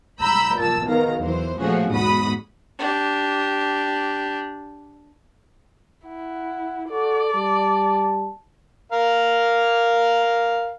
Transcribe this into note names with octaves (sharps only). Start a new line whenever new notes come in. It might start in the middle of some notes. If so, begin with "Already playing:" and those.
A#5 B5 E6 G6
A#2 A5 E6
B1 D#3 F5 A#5
E2 E3 F#3 C5
A#2 F3 A3 C#4 F#4 G#4
B1 E2 G#2 F#4 B5 D#6
D4 G4
E4 F#5
F#4 A4 D5
G3 A5
A#4 F5